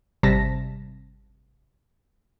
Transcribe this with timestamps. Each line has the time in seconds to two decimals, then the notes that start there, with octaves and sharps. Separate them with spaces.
0.23 G#1 C3 G3 A5 A#6 B6